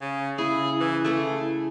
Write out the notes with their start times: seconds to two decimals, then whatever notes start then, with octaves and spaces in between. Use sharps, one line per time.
0.01 C#3
0.38 C#3 E4 G#4
0.81 E3
1.04 A3 E4 G#4 A4